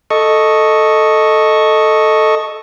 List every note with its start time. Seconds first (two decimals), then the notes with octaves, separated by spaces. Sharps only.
0.10 A4 D#5 C#6